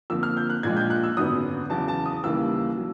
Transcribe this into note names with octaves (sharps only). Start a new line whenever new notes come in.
F2 D3 F3 A#3 E6
F6
G6
F#6
A#1 A#2 F3 G#3 G#6
G6
F#6
E6
G#1 F#2 D3 F#3 B3 D#6
E2 C#3 F#3 A5
A5
D#6
D#2 C#3 E3 G3 A#3 E6
F#3